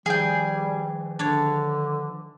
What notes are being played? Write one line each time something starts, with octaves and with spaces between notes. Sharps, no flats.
D#3 F3 G3 G#4 G5
D3 D4 C#5